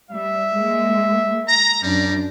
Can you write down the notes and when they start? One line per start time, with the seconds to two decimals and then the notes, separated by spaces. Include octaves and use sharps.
0.11 G3 E5
0.52 G#3 A#3
1.48 A#5
1.83 F#2 G3 D4 A#5